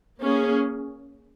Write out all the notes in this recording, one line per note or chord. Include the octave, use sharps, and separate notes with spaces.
A#3 C#4 G#4